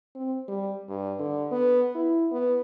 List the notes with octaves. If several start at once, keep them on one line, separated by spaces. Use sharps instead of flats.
C4
G3
G2
D3
B3
E4
B3